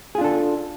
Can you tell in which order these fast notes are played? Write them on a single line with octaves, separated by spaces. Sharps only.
G#4 F4 D4 A4